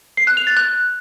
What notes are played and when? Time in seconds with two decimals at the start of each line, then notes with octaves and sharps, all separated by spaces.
0.17 C7
0.27 F#6
0.37 F7
0.47 A6
0.57 F#6